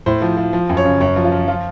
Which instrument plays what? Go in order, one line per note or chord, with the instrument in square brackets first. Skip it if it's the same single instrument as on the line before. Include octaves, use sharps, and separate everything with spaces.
[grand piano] A2 C5
F3
F3
F3
F#2
C#5
C#3
F#2 C#5
F3
F4
F3
F3 F4